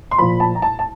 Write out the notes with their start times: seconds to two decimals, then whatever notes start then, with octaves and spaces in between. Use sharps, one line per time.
0.11 C6
0.18 A#2 F3 B5
0.40 A5
0.55 A#5
0.62 A5
0.79 A5